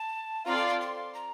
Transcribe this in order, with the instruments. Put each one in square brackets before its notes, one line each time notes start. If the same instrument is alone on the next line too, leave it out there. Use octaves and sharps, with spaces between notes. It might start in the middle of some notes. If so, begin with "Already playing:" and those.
Already playing: [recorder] A5
[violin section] C4 F4 A4 D5 F5 [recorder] A#5
[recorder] C6
C6
C6
A#5